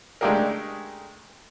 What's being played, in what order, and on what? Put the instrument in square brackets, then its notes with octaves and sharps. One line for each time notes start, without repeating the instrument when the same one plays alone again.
[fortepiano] G#3 A3 D4 G4 G#4 A#4